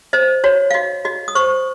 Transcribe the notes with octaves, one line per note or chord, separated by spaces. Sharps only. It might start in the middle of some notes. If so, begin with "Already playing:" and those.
C5 D#5
F#4 C#5
F5
F#4 D#5
F#4 D#5
D#6
C5 C#6